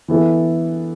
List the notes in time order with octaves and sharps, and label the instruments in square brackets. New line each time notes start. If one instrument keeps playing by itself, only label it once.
[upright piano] E3 B3 E4 A4